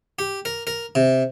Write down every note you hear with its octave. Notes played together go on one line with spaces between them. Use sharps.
G4
A#4
A#4
C3